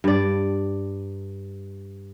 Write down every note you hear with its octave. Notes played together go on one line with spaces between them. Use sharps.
G2 D5